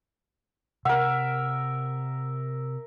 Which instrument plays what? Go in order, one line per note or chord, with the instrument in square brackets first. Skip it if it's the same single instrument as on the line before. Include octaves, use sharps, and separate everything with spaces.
[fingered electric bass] C3 [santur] A#4 E5 [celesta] F#5